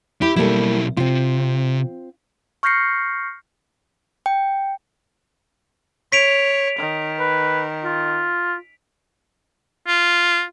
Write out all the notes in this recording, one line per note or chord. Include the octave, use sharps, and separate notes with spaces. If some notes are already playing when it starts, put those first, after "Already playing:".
E4 G4
B1 G3 A#3 E4 A4
C3 C4 F4
C#6 F6 G6 A#6 C7 C#7
G5
C#5 B6 D7 F7
D#3
B4
F4
F4